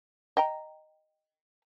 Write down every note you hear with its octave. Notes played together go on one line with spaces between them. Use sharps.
D#5 G5 A#5